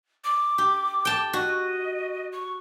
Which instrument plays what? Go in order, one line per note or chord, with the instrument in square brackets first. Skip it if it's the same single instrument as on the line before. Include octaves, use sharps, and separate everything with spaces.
[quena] D6
[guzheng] G4
G5 A5
[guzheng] F#4 [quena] D#5
[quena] C#6